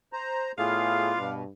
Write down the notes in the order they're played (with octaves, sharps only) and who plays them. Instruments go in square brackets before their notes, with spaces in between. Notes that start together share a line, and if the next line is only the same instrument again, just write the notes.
[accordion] C5 A#5
[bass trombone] A2 [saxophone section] B3 D5 F5 [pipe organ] F4 [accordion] G#4
[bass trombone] G2 [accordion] B2